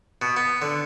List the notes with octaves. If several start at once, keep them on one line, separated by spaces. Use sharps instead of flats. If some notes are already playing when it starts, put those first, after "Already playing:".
B2
B3
D3